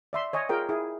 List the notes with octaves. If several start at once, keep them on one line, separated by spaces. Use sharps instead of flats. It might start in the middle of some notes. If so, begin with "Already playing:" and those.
D5 E5 C6
C#5 D#5 G#5
F4 G#4 A#4 G5
E4 G#4